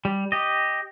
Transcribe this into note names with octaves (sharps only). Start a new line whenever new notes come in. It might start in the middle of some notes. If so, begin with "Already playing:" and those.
G3
G4 D#5